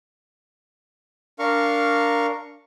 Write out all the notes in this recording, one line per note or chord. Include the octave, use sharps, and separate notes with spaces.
D4 A#4 F5 C#6